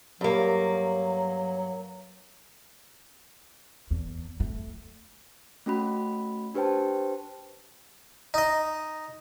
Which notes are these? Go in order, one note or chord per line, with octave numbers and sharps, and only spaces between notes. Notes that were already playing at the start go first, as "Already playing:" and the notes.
G2 F#3 A#3
E2
A3
A3 C#4 F#4 B5
D4 G4 B4 C5 G5 A5
D#4 D#5